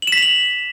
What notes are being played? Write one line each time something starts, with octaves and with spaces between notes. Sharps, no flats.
F#7
E7
B6
F7
F#7